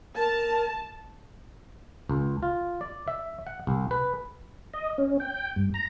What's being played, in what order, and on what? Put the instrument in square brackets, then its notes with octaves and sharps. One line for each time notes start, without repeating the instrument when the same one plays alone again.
[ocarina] A#4 [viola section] A5
[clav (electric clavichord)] C#2
F4
D5
E5
F#5
C2
B4
[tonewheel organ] D#5
C#4
G5
G2
A#5